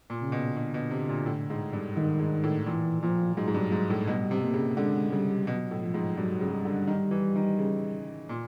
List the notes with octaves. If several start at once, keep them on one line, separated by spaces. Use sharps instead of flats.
A#2
C#3
B2
B2 D3
B2
C3
A#2
A2
G#2
G2
G#2 D#3
G#2
A2
A#2 E3
A#2 F3
G#2 F#3
G#2
G2
G#2
A2
B2 G3
C3
A#3
C#3
D3 G#3
C#3 G3
B2 F#3
A2
F3
G#2
G2 F#3
C#3
G3
D3
D#3
E3
D#3
C#3
A#2